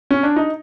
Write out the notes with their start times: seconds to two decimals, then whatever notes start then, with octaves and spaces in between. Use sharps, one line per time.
0.11 C#4
0.23 D4
0.36 D#4